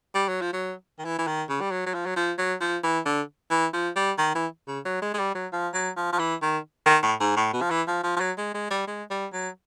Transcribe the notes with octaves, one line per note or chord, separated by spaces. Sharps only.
G3
F#3
F3
F#3
D#3
E3
E3
D#3
C#3
G3
F#3
F#3
F3
F#3
F3
F#3
F3
E3
D3
E3
F3
G3
D#3
E3
C#3
F#3
G#3
G#3
G3
F#3
F3
F#3
F3
F3
E3
D#3
D#3
A2
G#2
A2
B2
F3
E3
F3
F3
F3
F#3
G#3
G#3
G3
G#3
G3
F#3